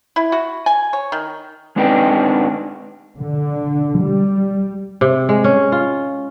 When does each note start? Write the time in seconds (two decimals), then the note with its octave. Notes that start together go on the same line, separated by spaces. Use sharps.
0.16 E4
0.32 F#4
0.66 G#5
0.93 C#5
1.12 D#3
1.76 G#3 C4 D4 D#4 B4 G5
3.19 D3
4.02 G3
5.01 C3
5.29 G#3
5.44 C#4
5.72 F4